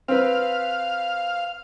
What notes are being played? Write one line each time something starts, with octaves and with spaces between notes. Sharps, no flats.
C4 B4 F5